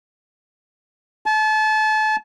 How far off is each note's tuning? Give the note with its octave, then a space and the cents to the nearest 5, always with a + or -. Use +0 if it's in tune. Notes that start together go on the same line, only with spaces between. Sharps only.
A5 -30